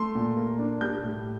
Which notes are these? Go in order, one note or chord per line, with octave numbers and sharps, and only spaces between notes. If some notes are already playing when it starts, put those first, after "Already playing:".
Already playing: A3 C6
A#2
A#3
D4
G3 G6
A2